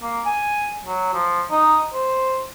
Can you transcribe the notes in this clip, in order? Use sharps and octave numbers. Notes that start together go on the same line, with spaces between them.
A#3
G#5
F#3
F3
D#4
C5